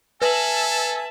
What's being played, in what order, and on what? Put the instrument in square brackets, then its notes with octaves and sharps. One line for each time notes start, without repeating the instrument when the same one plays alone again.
[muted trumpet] A4 [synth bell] B4 F#7 [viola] E5 A5 [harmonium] G#5